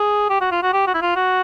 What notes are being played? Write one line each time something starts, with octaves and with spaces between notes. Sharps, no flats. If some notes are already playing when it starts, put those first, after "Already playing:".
Already playing: G#4
G4
F#4
F4
F#4
G4
F#4
E4
F4
F#4